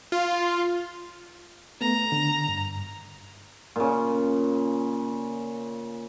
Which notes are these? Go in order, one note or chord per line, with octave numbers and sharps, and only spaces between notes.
F4
A3 B3 A#5
D3
G2
A#2 C#3